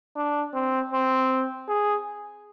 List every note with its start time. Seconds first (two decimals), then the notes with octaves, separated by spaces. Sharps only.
0.16 D4
0.54 C4
0.92 C4
1.68 G#4